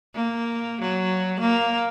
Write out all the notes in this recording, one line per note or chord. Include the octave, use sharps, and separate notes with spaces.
A#3
F#3
A#3